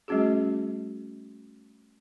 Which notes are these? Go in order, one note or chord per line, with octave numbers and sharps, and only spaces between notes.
G3 A3 C#4 F#4 G#4